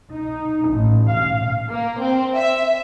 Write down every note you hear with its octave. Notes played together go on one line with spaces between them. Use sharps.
D#4
A1
F5
A#3
C4
E5